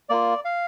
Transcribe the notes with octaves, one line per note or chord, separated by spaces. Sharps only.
A#3 F4 D5
F5